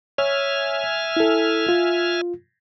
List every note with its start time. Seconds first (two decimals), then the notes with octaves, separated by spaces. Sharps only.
0.18 C#5 E5 G#5 F6
1.17 E4 A4
1.69 F4